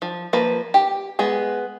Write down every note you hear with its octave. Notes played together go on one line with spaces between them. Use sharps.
F3
F3 A#3 B4
G4
G#3 B3 G#4